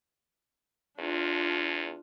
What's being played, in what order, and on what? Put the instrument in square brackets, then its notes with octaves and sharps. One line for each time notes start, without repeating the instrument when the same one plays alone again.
[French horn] E2 [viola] D4 F4